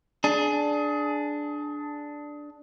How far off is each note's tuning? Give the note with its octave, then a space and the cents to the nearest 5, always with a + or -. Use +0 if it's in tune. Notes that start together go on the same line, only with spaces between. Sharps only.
D4 +0 G#4 +20